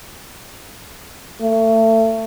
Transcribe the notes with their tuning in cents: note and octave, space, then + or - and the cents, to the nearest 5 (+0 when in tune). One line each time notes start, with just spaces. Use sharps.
A3 +30